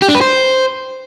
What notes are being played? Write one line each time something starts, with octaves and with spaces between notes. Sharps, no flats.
G4
D4
B4
C5